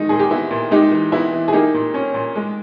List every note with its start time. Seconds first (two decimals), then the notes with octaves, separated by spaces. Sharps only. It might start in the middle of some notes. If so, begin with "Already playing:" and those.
Already playing: D#3 G#3 D#4
0.09 A#2 G#4
0.19 G4
0.31 B3 E4
0.51 A#2
0.71 G#3 D#4 G4
0.92 E3
1.12 B3 E4
1.32 E3
1.48 G#4
1.53 A#3 D#4 G4
1.74 A#2
1.94 C#4
2.14 A#2
2.35 G#3